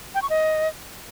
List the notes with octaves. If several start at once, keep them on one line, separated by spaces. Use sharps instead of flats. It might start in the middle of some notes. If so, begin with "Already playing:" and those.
G5
C#6
D#5